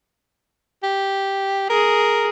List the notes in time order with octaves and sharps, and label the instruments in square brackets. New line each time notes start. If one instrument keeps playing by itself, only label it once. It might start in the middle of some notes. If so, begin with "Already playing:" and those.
[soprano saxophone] G4
[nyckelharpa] G#4 [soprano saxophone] A#4